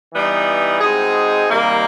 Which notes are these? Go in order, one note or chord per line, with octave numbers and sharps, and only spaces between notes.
E3 G3 B3 D#4
B2 G#3 C4 D#4 G#4
C3 D#3 G3 A#3